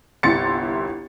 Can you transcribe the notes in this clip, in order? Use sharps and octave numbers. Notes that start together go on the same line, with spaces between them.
G1 C2 E4 C6 A6 C#7